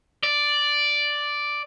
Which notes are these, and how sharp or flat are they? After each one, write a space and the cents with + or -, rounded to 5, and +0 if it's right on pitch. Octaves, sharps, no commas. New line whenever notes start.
D5 +0